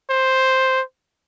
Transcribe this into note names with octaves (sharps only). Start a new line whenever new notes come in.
C5